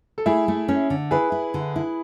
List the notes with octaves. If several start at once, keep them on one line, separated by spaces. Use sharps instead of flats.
A4
A3 E4 G#4
A3
C#4
D3
E4 G#4 B4
E4
D3
E4